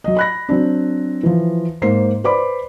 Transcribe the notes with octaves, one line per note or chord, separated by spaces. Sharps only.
F#3 D#5
B5 F#6 A#6
F#3 C4 D4
E3 F3
G#2 A#3 C5 C7
B4 C5 D5 B5 D6